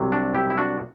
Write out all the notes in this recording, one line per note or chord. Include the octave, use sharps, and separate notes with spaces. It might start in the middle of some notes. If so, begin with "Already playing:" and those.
Already playing: C2 C3 F#3
D4 F#4
E4 G4
E4
D4 F#4